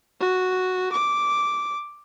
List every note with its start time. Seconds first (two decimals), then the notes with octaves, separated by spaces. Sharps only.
0.20 F#4
0.92 D6